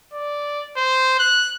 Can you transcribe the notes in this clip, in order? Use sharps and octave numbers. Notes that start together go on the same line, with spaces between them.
D5
C5
F#6